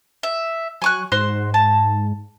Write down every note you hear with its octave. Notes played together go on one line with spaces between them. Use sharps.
E5
F#3 G#5 C#6 F#6
G#2 F#4 C5 C6
A5